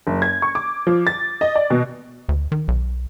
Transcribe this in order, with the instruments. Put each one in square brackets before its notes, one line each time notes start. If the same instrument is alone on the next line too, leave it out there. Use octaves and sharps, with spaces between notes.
[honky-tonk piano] F#1
G#6
C#6
D6
F3
A6
D#5
D5
B2
[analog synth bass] D2
D#3
B1